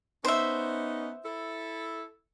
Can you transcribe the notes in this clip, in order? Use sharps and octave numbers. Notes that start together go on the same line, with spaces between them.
B3 C#4 D#4 C5 E5
E4 A4